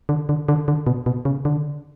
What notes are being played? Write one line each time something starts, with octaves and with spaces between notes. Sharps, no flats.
D3
D3
D3
D3
B2
B2
C#3
D3